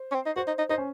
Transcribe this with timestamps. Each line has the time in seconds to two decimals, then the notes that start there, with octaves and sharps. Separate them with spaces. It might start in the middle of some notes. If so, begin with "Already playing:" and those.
Already playing: C5
0.11 C#4
0.15 C4
0.26 D#4
0.36 F#4 C5
0.47 D#4
0.58 D#4
0.69 D#4 C5
0.78 C#4